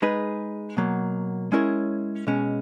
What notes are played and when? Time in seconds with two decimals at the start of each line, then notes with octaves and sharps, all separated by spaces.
0.02 G#3 D#4 G#4 B4
0.77 B2 F#3 A#3
1.52 G#3 C#4 E4 A#4 C#5
2.27 B2 G#3 C#4